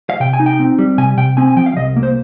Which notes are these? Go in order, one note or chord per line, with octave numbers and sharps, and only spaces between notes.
F5
C3 G5
G#5
D#4
G5
C4
G3
C3 G#5
C3 G5
C4 G#5
G#5
F3 G5
F5
C2 D#5
A#3
C5